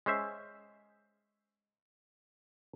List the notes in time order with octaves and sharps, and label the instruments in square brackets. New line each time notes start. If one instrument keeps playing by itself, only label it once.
[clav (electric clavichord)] G#3 C#4 C5 E5